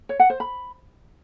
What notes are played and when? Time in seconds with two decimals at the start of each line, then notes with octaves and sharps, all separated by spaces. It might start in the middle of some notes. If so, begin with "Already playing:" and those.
0.09 C#5
0.20 F#5
0.30 C5
0.40 B5